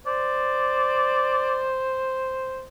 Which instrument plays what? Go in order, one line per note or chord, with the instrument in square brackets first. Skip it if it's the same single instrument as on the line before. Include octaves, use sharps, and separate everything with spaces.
[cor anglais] C5 [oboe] D5